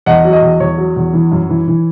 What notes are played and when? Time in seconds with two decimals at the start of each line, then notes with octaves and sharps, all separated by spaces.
0.06 E2 D#5 F#5
0.25 F#3
0.33 D#5
0.42 E2
0.60 E2 C#5
0.78 F#3
0.96 E2
1.13 E3
1.32 F#2
1.49 E3
1.67 E3